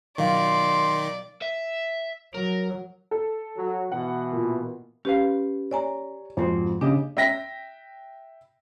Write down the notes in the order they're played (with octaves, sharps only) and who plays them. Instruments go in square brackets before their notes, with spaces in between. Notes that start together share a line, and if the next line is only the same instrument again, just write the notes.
[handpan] B2 F#3 F5 [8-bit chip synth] D#3 [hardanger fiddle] D5 [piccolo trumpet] C6
[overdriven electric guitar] E5
[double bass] F#3 [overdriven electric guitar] A#4
[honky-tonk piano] A4
[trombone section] F#3
[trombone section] B2 E3 [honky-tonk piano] F#5
[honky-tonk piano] A#2
[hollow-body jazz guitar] C#4 B4 F5 [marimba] G4
[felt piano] C#5 [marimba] D5 G#5 A#5
[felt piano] F2 [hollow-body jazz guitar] G#2 C4 F#4
[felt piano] C#3 [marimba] D4 [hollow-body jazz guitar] G4 D#5
[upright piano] E5 G5 A#6 B6